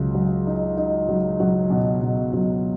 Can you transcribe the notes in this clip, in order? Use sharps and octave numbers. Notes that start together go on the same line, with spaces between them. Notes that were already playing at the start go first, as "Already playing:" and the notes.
Already playing: C#2 F#3
F#3
D#4
D#4
F#3
F#3
B2
B2
F#3